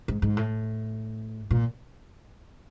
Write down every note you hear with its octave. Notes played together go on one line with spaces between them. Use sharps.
G#2
G#2
A2
A#2